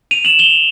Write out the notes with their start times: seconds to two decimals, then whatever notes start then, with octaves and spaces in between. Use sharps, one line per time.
0.11 D#7 F7
0.25 E7 F#7
0.39 F7 G7